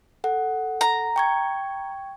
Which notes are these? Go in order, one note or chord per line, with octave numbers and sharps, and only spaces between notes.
A4 F#5
A#5
G5 C#6 G#6